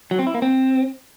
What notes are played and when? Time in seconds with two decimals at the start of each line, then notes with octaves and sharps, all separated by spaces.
0.11 F#3
0.19 C4
0.27 E4
0.34 A#3
0.42 C4